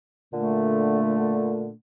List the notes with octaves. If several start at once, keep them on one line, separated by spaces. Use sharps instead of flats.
A#2 D3 A3